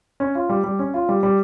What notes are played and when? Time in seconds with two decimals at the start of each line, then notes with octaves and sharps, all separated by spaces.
0.20 C#4
0.35 F4
0.49 G3
0.64 G3
0.79 C#4
0.94 F4
1.09 G3
1.23 G3